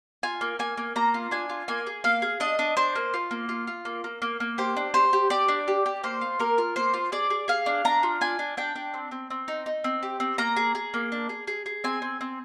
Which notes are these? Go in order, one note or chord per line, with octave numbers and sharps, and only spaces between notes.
F4 G#5
A#3
A#3 G#5
A#3
A#3 A#5
F4
D4 G#5
F4
A#3 G#5
G#4
A#3 F5
G#4
D4 D#5
D4
D4 C5
A#3
F4
A#3
F4
F4
A#3
A#3
A#3
A#3
G4 C5
D4
G4 C5
G4
G4 D5
D4
G4
G4
A#3 C5
F4
A#3 A#4
F4
A#3 C5
F4
G#4 D5
G#4
G#4 F5
D4
D4 A#5
F4
D4 G#5
D4
D4 G5
D4
C4
C4
C4
D#4
D#4
C4
G4
C4
A#3 A#5
G#4
G#4
A#3
D4
G#4
G#4
G#4
C4 G#5
C4
C4